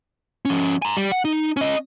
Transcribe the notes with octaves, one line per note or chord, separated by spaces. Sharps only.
F3 C#4
G#5 A#5
G3
F#5
D#4
C#4 D#5